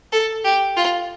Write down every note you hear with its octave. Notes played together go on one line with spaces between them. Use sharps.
A4
G4
F4